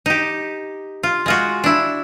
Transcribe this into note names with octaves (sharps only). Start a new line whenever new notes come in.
D#4 G4
F4
G#3 F4 F#4
D4 E4